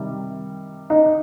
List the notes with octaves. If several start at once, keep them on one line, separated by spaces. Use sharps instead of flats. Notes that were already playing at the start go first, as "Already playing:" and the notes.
Already playing: C3 D#3 G3
D#4